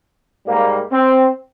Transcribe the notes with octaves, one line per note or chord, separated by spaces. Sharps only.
G#2 G3 A#3
C4